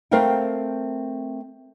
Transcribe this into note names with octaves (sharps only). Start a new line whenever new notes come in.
A3 C4 A#4 C5 F5 G5